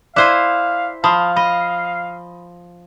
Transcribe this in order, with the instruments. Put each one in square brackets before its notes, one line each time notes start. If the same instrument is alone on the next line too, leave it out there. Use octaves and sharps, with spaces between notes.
[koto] E4 C5 G#5 [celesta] D5 D6 F#6 [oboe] F5
[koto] F3 [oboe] F5 [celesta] A5 B5 D#6
[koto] D#5 [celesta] B5